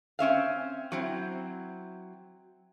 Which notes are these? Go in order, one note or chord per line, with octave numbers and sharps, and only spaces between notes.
C4 C#4 E5 F5
F#3 C4 E4